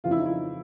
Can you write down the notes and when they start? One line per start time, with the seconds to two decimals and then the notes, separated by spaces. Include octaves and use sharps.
0.04 F2 C#3 E3 F4
0.11 E4
0.18 D#4
0.26 E4